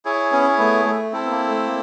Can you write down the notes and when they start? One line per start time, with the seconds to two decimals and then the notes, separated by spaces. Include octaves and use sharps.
0.05 E4 G#4 C#5
0.32 B3 C#4
0.58 A3 B3
0.85 A3
1.12 C4 E4 A4
1.25 B3
1.30 A#3
1.48 A3
1.66 A#3